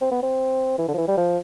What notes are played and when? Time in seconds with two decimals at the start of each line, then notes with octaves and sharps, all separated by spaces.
0.01 C4
0.12 B3
0.23 C4
0.78 E3
0.88 D3
0.94 F3
0.98 E3
1.08 G3
1.17 F3